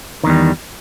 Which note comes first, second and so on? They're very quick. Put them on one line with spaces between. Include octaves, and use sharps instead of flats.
D#3 E2 G3